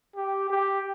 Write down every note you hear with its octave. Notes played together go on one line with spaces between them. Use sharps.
G4
G4